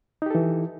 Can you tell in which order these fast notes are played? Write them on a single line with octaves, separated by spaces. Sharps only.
D#4 G4 A4 E3